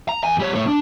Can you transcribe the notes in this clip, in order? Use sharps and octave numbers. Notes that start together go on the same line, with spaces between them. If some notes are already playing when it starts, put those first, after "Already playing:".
A#5
E2 G#5
G3 C#5
A2 C#5
D4